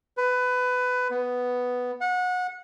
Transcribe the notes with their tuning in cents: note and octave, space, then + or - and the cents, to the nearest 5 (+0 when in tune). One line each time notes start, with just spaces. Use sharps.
B4 +20
B3 +5
F#5 -25